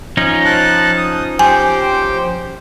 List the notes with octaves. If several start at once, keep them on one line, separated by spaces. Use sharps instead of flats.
F3 C#4 D#4
A5 F#6
D#6
G4 C5 G5 G#5